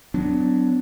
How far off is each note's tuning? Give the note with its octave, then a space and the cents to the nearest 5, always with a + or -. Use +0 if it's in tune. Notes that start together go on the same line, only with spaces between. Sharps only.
F#3 +10 B3 +40 D4 +0